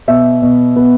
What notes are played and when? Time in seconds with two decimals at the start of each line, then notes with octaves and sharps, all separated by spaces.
0.08 B2 E5
0.42 B2
0.76 B3